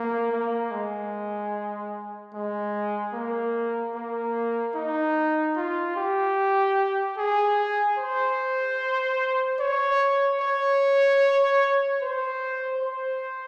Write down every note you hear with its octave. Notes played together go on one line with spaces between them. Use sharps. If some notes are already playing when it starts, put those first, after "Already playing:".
Already playing: A#3
A#3
G#3
G#3
A#3
A#3
D#4
F4
G4
G#4
C5
C#5
C#5
C5
C5